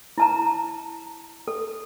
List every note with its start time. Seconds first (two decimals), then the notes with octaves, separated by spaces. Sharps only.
0.18 E4 A5 A#5
1.48 A4